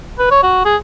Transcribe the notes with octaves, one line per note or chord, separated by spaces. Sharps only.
B4
C#5
F#4
G#4